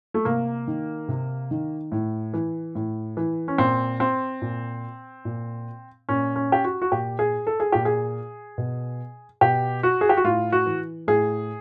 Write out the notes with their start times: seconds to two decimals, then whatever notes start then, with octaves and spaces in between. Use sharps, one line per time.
0.14 A3
0.25 C3 A#3
0.68 D#3
1.08 C3
1.51 D#3
1.92 A2
2.34 E3
2.75 A2
3.17 E3
3.48 C#4
3.58 A#2 C4
4.00 C4
4.42 A#2
5.25 A#2
6.09 A#2 C#4
6.36 C#4
6.52 G4
6.64 F#4
6.82 F#4
6.92 A#2 G4
7.19 G#4
7.47 A4
7.60 G#4
7.72 A#2 G4
7.85 G#4
8.58 B2
9.41 B2 G4
9.83 F#4
10.01 G#4
10.09 G4
10.17 F#4
10.24 A2 F4
10.52 F#4
10.66 E3
11.08 A2 G#4